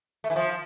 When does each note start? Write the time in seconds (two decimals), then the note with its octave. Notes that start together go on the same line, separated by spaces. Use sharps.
0.24 A3
0.30 E3
0.36 F3